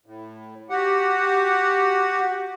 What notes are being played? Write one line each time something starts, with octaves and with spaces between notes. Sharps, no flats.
A2
F#4 G4 F#5